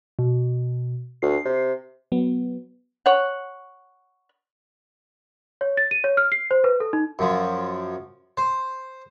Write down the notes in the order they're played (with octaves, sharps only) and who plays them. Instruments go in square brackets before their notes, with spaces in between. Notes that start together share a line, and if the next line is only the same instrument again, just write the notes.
[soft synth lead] B2
[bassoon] D2 [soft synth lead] C7
[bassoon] C3
[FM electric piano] F#3 B3
[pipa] C#5 F#5
[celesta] C#5
A6
D#7
C#5
F6
C7
C5
B4
A4
D#4
[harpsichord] F#2 F3
C5